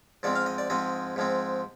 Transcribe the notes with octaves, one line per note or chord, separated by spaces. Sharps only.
G#2 F3 G#3 C4 D5
F5
D#5
D5
G#2 F3 G#3 C4 D#5
G#2 F3 G#3 C4